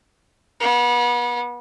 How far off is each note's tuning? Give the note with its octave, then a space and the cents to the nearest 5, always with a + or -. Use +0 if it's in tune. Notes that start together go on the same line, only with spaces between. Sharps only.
B3 -35